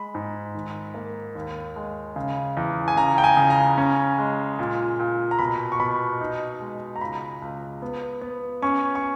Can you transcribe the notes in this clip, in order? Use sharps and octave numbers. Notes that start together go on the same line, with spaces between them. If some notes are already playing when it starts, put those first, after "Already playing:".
Already playing: G#3 B5
G#2
D#3
A#3
D#2
G#3
C#3
E2
G#5
C#3 A#5
G5
G#5
C#3
A#5
C#4
G#3
A#2
A#2
A#5
B2 B5
C#6
B2 B5
D#4
G#3
A#5
C#2 B5
C#2
B3
B3
C#4 C#6
C#6